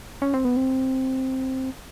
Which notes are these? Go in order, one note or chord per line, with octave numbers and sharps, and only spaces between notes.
C#4
C4
B3
C4